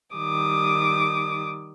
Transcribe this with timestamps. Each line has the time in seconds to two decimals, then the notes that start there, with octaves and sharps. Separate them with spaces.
0.16 D#3 G3 D6 D#6